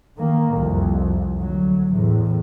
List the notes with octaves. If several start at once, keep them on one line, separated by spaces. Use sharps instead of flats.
D#3 A#3
C2 F2
D2 F#3
E2 A2